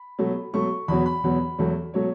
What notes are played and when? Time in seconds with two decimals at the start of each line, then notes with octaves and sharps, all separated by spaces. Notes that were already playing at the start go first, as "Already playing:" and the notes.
Already playing: B5
0.19 B2 F#3 A3
0.53 B2 F#3 A3 C#6
0.88 E2 B2 F#3 B3 B5
1.06 B5
1.24 E2 B2 F#3 B3
1.59 E2 B2 F#3 A3
1.94 B2 F#3 A3 C#5